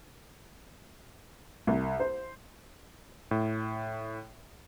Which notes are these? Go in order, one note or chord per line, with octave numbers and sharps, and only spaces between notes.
C2
C5
A2